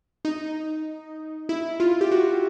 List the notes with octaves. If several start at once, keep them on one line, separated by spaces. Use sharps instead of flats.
D#4
E4
F4
G4
F#4